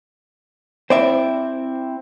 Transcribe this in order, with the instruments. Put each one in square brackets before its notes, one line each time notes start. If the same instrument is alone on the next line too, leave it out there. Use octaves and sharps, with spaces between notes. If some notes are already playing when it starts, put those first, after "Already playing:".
[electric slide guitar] C4 E4 [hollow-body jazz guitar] C5 D5 E5